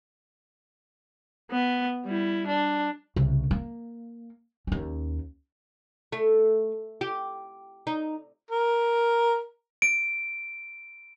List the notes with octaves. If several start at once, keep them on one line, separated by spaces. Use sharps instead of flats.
B3
G3 E4
D4
C2 C#3
A#3
D#2 C#4
A3
G4
D#4
A#4
D7